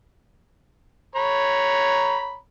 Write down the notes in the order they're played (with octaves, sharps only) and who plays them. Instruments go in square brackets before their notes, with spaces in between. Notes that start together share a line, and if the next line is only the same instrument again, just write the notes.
[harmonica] C#5 A#5 B5